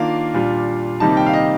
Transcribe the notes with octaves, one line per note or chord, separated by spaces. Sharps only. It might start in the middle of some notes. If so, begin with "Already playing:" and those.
Already playing: D#3 A#3 D4 F4 F5
A#2 G3 D4 F4
C3 D#3 G3 A#3 D#4 A5
G5
F5
D#5